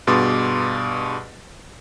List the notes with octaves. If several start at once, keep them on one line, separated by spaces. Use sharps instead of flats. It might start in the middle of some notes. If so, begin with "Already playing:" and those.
G2 B2 G#4 C6 D6 A6